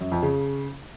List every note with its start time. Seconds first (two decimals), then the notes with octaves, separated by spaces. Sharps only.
0.01 F#2
0.12 F2
0.22 C#3